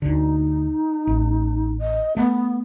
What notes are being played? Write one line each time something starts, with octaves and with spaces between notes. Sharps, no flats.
D2 D3 D#4
A1
D#5
A3 B3